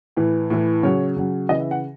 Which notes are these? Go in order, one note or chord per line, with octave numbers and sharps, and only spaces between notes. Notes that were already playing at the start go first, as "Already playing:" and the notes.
A2 E3
A2 E3
C#3 F#3 C#5
C#3 F#3
C#3 E3 D#5
E5
F#5